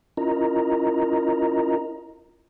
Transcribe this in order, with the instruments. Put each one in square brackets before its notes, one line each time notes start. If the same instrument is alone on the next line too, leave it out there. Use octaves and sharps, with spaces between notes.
[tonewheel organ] C#4 E4 F4 A#4 D#5 A#5